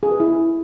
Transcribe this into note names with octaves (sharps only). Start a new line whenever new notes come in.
G#4
B4
E4